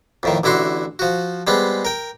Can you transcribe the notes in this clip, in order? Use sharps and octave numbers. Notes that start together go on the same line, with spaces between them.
F2 A2 D#3
A1 D3 E4 F#4 C6
F3 F#4
G3 G#3 B3 C4
A#4 G5